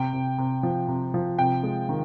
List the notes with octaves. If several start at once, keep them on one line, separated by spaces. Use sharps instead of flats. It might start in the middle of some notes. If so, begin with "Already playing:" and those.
Already playing: C3 G5
C3
C3
F3
C3
F3
C3 G5
G#3
D#3